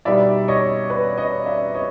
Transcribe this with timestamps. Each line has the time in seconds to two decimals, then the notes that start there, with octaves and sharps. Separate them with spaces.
0.05 B2 G3 B3 D#4 D5 E5
0.48 C#5 D#5
0.90 B4 C#5
1.18 C#5 D#5
1.46 D5 E5
1.75 C#5 D#5